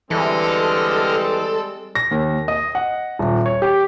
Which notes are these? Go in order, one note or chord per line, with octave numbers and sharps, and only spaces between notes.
D3 E3 G3 G#3 C4 A4 D#5 F6
A#6
D#2
D#5
F#5
D#1
C#5
G4